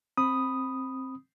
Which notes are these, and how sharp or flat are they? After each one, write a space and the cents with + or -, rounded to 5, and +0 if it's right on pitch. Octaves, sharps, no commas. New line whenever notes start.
C4 +15 B5 +0 D#6 +0